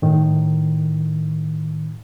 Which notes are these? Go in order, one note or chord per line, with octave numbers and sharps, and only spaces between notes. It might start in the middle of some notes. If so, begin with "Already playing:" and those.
A2 D#3